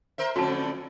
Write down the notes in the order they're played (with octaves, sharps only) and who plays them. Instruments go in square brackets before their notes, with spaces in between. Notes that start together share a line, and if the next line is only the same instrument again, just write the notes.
[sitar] A#4 C5 E5
[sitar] F2 A2 D3 [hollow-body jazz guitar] F#3 C#4 A4 [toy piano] F#4 A5